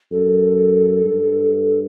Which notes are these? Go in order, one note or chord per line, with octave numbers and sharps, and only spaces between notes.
F#2 A4
G2